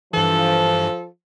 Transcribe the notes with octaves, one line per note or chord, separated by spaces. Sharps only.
G2 E3 F3 A4